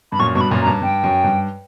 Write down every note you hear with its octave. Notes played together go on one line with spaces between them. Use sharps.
G2 B5
F#2 A#2 C#6
G2 B2 C#6
B5
F#2 A#2
A#5
G2
G2 G5
F#2
G2